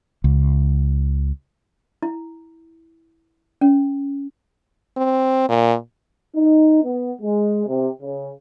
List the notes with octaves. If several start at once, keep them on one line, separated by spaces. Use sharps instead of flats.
C#2
E4
C#4
C4
A#2
D#4
B3
G#3
C3
C#3